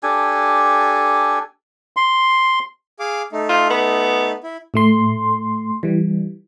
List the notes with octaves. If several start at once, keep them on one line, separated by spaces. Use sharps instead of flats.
D4 G4 A4 G#5
C6
G#4 F5 D6
A3 D#4
F4
B3
E4
A2 A3 C6
E3 G3